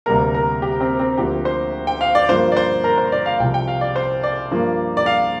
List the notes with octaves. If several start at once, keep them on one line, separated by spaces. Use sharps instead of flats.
D2 C3 G3 A#3 A#4
A#4
G4
C4
C4
D2 D3 F3 A#3 G4
C5
G5
F5
D5
G2 F3 A#3 C5
D5
C5
A#4
C5
D5
F5
C2 C3 F3 G5
G5
F5
D5
C5
D5
G2 F3 A#3
D5
F5